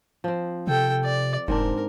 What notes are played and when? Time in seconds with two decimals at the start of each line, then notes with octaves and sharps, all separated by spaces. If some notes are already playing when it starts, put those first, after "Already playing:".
0.24 F3 C4
0.67 C3 A4 G5
1.05 D5
1.48 F1 G#2 C4 D4 A#4